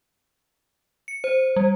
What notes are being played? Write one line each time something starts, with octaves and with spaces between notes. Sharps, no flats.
C#7
C5
G3